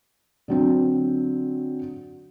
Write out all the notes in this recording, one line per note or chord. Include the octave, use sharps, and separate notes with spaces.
D3 F#3 C4